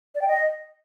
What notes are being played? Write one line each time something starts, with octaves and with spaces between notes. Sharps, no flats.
D5
G5
D#5